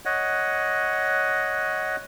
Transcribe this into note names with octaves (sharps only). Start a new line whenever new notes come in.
C#5 D#5 F#5